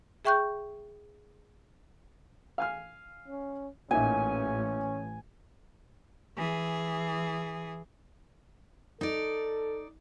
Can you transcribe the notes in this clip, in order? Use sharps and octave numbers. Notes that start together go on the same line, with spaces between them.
G#4 E5 G5 C#6 F#6 G6
F5 G#5 F6
C#4
A1 A#2 C#4 D#4 E5 G#5
E3 G#4
D#4 A4 D5